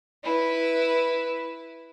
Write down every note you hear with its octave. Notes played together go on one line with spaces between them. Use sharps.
E4 B4